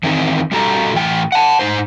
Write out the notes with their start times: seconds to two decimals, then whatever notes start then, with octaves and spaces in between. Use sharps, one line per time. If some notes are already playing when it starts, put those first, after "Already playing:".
0.03 D#3 E3 C4 D#4 G#4
0.52 G3 F#4 A4 G5 A#5
0.93 A2 E3 G5
1.32 F#5 A5
1.59 G#2 D#4 C5